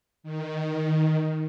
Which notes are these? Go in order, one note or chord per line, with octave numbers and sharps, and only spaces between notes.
D#3